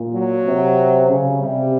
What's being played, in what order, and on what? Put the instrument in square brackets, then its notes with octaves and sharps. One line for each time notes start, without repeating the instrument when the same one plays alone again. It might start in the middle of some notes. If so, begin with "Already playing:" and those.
Already playing: [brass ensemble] A#2
[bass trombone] F#3
[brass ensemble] C3
C#3
[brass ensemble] C3 [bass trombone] G3